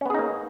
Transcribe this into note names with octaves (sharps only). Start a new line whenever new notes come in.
A#3 B3 C#4 D#4 G#4